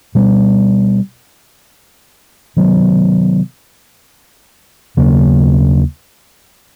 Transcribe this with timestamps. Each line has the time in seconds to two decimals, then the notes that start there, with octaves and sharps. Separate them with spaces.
0.15 B2 G3 B3
2.57 C3 D#3 F#3 B3
4.97 D#2 C#3 F#3 A#3